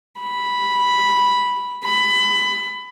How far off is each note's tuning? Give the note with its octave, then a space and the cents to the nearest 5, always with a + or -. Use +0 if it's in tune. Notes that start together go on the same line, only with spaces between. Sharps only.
B5 -5
B5 +20